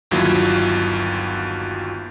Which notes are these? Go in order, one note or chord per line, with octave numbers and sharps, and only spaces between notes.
G1 D#2 F#3 E4 F4